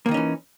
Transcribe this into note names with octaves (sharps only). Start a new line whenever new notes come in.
D#3 E3 A#3 C#4 D#4